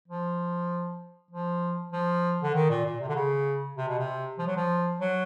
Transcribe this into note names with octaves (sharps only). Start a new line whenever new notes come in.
F3
F3
F3
D3
D#3
A#2
A#2
C3
D3
C#3
C3
B2
C3
F3
F#3
F3
F#3